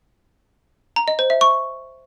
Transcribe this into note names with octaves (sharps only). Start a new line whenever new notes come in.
A#5
D#5
C5
E5
C#6